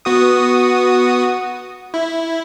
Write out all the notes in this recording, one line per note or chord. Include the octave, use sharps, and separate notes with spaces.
B3 F#4 D#6
E4